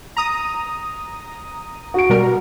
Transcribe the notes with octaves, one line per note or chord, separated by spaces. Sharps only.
A#5 D#6
F#4 D7
B2 G3 A#4